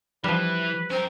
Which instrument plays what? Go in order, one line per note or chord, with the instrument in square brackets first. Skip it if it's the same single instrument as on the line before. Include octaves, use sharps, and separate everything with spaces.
[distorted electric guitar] E3 [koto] F3 G3 [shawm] B4
[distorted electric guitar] C#4 A#4 [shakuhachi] C5